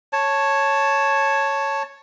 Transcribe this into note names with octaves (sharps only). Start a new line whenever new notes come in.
C#5 A5